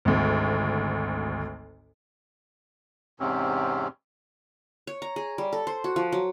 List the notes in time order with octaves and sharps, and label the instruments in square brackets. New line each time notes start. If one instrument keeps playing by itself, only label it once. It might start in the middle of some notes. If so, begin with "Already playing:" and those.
[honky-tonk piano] G#1 D2
[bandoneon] E2 G#2 C3 C4 C#4
[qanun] C#5
A#5
G#4
G3
A4
C5
F#4
F3
F#3